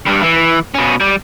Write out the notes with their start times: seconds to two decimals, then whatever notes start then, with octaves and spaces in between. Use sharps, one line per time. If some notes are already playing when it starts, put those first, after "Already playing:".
0.06 G2 G3
0.22 E3
0.75 B2 C#4
1.00 G3